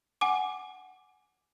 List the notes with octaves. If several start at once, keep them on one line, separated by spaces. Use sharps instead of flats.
F#5 G#5 D6